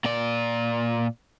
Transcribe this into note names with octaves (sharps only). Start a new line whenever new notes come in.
A#2 D5